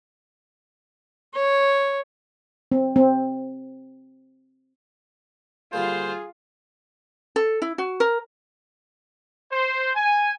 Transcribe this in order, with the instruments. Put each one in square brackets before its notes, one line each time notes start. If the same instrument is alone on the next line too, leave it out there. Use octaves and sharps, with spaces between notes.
[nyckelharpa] C#5
[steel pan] C4
C4
[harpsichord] D3 G3 A#3 [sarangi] F4 [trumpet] G#4 [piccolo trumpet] C5
[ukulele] A4
E4
F#4
A#4
[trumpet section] C5
G#5